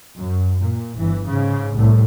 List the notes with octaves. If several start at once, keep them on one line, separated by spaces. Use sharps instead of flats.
F#2
A#2
G1 E3
G#2 C#3
C2 A2